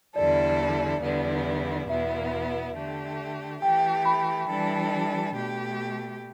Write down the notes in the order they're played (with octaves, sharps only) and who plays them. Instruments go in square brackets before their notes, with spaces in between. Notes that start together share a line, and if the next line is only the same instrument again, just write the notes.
[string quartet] E2 D3 G3 E4 A4 [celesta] D5
[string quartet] E2 D3 G3 B3 E4
[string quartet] E2 B2 B3 E4 [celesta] E5
[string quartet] D3 A3 G4
[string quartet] E3 A3 G4 [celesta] G5
[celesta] B5
[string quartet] E3 G3 D4 A4
B2 A3 G4